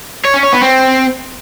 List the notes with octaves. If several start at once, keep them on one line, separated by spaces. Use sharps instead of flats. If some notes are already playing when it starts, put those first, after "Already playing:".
C#5
C#4
C#5
B3
C4